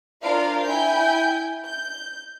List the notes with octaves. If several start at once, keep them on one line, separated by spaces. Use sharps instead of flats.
D4 F4 A#4 C5 D5 F5
E4 G5 G#5 G6
G6